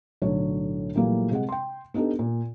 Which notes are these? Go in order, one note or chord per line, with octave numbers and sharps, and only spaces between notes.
B1 A2 D3 F#3 C#5
A#2 E3 F#3 G3 A3 A#3
C3 G#3 F#5
G5 C6
B3 D4 D#4 G4 A4
A#2